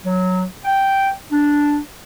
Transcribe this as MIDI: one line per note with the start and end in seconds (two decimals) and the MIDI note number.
0.04 0.43 54
0.64 1.06 79
1.31 1.77 62